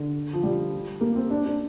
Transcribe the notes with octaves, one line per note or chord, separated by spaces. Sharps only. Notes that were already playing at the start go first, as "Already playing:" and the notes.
Already playing: D3
F3
G3
A#3
C4
D4
D4